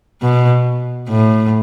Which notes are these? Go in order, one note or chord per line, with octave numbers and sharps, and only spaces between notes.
B2
A2